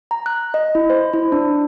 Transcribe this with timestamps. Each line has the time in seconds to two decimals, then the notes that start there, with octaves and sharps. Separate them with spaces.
0.11 A#5
0.26 F#6
0.54 D#5
0.75 E4
0.90 C5
1.13 E4
1.32 D4